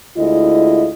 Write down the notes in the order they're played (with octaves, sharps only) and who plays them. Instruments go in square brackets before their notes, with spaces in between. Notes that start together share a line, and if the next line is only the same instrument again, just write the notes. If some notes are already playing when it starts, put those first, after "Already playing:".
[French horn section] D2 G#3 E4 F4 D#5